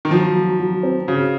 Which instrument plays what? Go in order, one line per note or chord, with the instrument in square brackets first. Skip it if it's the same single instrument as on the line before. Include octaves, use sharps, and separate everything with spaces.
[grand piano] D#3
[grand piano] F3 [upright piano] F#3
[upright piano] F#3
F#3
C4
[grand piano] C#3 [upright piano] F#4